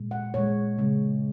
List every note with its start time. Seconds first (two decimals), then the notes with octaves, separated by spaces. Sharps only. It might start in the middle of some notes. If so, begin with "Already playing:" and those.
Already playing: A#2 G#3
0.11 F#5
0.34 A#2 G#3 C#5
0.78 C#3 G#3